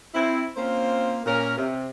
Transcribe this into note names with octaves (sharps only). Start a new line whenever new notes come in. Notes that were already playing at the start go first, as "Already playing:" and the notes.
C4 E4
A#3 C4 C#4 F4 C5
A#2 C#4 A#4
C3